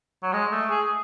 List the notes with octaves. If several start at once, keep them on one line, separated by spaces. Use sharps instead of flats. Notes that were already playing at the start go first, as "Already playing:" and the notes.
F#3
G#3
A3
G#4